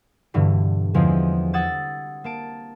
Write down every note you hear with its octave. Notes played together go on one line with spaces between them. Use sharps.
G2 B2 D3 E3
E2 D3 F3 G#3 C4
F#5 D#6 E6 G#6 A6
A#3 A5 D7